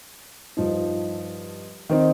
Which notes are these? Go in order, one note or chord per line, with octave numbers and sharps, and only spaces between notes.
G2 F3 D#4
D#3 C4 D#4